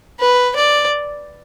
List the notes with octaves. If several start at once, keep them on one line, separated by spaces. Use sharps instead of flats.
B4
D5